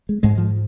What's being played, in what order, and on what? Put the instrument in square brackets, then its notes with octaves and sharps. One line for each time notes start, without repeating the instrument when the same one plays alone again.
[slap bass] G#3
G#2 G#3
F3